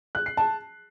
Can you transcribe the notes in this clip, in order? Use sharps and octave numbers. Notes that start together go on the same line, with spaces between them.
F#6
C7
A5